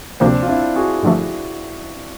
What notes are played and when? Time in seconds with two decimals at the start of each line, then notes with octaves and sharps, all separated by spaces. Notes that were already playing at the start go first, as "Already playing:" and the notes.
0.20 D2 C3 F3 A#3 C4 D4
0.43 F4
0.48 D4 E4
0.76 F#4 G#4
1.03 G2 D3 F3 A3